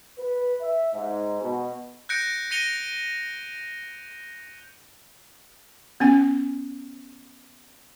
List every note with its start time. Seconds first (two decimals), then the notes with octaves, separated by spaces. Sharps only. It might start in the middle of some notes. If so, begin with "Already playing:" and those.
0.19 B4
0.61 E5
0.93 G#2
1.41 B2
2.09 F#6 G6 A#6 C#7 D7
2.51 A#6 C#7 D#7 F7 G7
6.00 B3 C#4 G#5